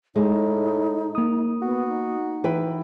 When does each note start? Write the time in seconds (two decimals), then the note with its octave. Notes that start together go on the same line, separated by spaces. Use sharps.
0.16 A2 G#3 D#4
1.15 A#3 D#6
1.62 B3 F#4
1.88 D#4
2.44 E3 B4 G5